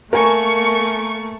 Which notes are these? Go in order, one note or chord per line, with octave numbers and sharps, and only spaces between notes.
A3 A#3 A#4 G#5 C#6